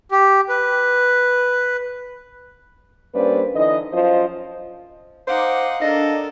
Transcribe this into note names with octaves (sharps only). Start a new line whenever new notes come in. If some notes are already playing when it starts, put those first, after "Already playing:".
G4
B4
G2 A#3 C#4 B4 C5 D5
D3 E3 D#4 D#5
F#2 F3 F4 C5 D#5
D#4 C5 F5 F#5 D6
D4 A4 A#4 D#5